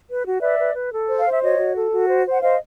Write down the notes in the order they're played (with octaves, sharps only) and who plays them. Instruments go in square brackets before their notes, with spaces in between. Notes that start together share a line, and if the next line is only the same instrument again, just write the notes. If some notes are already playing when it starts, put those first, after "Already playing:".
[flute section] B4
F#4
B4 D5 E5
B4
B4
A4
C5
F5
C5 E5
F#4 C#5 D#5
F#4
A4
F#4
C5
C5
F#5
C5 D#5 F5